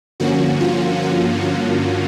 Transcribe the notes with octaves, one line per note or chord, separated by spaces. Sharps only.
G2 D3 F3 A#3 C#4 F#4
F4
F#4
F4